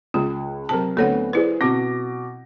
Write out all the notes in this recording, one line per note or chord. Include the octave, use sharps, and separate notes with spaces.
C#2 F4
C3 F#3 C4 A#4 A5
D2 B3 C4 A4 C#5 F#5
E4 G#4 B4 C5 D5
B2 C4 D6 A#6